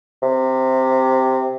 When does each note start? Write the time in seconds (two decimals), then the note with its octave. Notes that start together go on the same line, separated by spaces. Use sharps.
0.22 C3